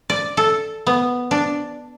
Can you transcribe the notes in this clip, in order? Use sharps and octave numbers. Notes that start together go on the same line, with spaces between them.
D5
A4
B3
D4